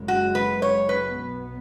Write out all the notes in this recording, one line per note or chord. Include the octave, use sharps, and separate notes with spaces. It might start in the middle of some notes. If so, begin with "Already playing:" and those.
Already playing: F#1 F#2 C#3 G#3
F#4
B4
C#5
B4
B1 B2 B3